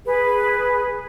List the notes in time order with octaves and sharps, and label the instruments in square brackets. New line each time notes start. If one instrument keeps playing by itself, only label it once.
[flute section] G#4 B4